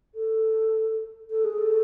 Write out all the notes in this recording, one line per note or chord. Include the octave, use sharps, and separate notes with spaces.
A4
A4
G#4
A4